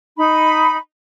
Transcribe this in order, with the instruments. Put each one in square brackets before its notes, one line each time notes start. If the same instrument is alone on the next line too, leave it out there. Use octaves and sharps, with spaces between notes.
[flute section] D#4 B5